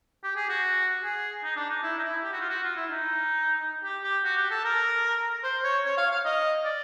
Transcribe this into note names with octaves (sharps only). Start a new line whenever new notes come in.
G4
G#4
F#4
G#4
D#4
D4
D#4
E4
D#4
E4
G4
F#4
F4
F#4
F4
E4
D#4
G4
G4
F#4
G4
A4
A#4
C5
C#5
C#5
F5
F5
D#5
D5